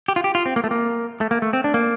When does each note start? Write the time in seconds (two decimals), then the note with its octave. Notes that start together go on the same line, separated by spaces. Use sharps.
0.08 G4
0.16 F4
0.24 G4
0.35 F4
0.46 C4
0.56 A#3
0.64 A3
0.71 A#3
1.21 A3
1.31 A#3
1.42 A3
1.53 C4
1.64 D4
1.74 A#3